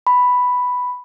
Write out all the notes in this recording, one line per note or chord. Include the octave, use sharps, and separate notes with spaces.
B5